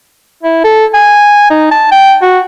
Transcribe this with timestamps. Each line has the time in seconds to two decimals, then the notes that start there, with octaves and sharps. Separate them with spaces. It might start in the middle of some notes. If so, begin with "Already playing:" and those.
0.43 E4
0.64 A4
0.94 G#5
1.50 D#4
1.71 A5
1.91 G5
2.22 F#4